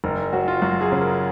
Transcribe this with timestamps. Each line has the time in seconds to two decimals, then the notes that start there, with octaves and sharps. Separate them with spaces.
0.04 F#1 A#4
0.33 F#3 F#4
0.48 F4
0.62 F#2 F#4
0.81 G#4
0.92 C#3
1.01 A#4